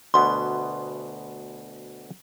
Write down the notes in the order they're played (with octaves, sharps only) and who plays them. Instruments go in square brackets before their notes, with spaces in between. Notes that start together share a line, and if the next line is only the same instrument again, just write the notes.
[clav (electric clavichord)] D2 B2 B3 [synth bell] C6